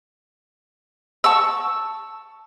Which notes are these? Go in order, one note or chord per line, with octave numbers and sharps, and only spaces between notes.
A5 C#6 E6